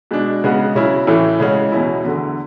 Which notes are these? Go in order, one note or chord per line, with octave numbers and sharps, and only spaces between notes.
B2 G#3 D4
C#3 G#3 B3 F#4
C#3 F#3 C#4 E4
A2 E3 A3 C#4 E4
C#3 G#3 C#4 F#4
E2 B2 F#3 C#4 E4
E2 D3 A3